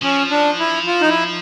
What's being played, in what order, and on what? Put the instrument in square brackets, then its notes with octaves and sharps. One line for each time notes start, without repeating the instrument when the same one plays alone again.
[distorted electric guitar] F3 [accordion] C#4
[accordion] D4
E4
F4
D#4
E4